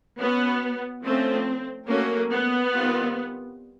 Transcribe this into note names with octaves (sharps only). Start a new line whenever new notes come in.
B3 C#4 F#4 B4
F3 A3 C4 C#4
F#3 A3 A#3 C#4 F#4 A#4
B3
D#3 G3 C4 F4